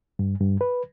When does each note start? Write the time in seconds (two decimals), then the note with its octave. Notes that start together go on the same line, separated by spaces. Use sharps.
0.19 G2
0.41 G2
0.61 B4